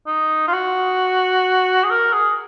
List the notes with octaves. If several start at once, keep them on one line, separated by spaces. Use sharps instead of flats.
D#4
F4
F#4
G#4
A#4
G#4